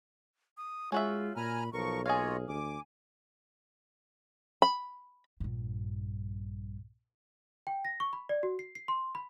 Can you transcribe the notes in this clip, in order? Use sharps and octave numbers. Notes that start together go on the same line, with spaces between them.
D#6
G#3 C#4 F4 F#4 E5
A#2 G#5 A#5 B5 F6
B1 F3 A#4 C#6
A#3 F4 G#4 C#5 D#5 F5
D2 G#5 D6
B5
A#1 G2
G5
A#6
C#6
B5
D5
F#4
C7
C7
C6
B5